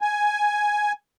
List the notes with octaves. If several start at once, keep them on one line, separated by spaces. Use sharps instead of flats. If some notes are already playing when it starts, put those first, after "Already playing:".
G#5